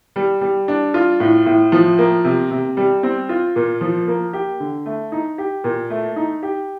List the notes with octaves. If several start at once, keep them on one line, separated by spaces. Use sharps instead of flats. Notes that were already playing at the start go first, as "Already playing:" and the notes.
G3
G3
D4
F4
A2
A2
F3
A#3
C3
C3
G3
C4
F4
A#2
F3
A#3
G4
D3
A3
D#4
G4
A#2
A3
D#4
G4